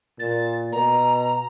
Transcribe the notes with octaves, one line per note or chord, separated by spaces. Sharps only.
A#2 A6
B2 A#5